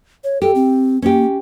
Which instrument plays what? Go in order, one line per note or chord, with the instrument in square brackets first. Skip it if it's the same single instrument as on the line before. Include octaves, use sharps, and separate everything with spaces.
[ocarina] C#5
[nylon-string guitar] G4 [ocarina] A4
[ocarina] C4
[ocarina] A#3 [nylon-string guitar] C#4 G4